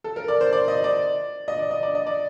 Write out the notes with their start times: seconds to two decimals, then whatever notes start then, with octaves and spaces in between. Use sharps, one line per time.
0.04 A4
0.16 A#4
0.28 D5
0.41 C5
0.53 D5
0.68 D#5
0.84 D5
1.48 D#5
1.59 D5
1.71 D#5
1.83 D5
1.95 D#5
2.07 D5